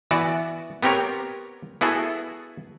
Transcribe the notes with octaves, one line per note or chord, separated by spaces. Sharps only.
E3 B3 F#4 D5
B3 C4 G4 A#4 C#5
B3 E4 F#4 G#4 A4